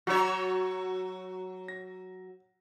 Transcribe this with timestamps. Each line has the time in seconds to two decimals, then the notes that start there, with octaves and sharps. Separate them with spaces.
0.07 F#3 F#4 C#5
1.68 A#6